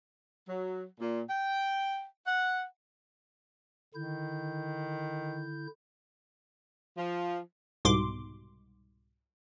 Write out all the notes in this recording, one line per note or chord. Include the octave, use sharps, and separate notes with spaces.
F#3
A#2
G5
F#5
D3 D#3 E4 G6
F3
C2 G#2 B2 C6 D6